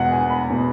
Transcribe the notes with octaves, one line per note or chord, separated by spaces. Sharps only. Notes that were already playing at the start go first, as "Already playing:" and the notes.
Already playing: E2 B2 G#3 F#5
G#5
B5
B2 G#3